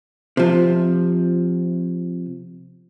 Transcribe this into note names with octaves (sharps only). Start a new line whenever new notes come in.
C3 F3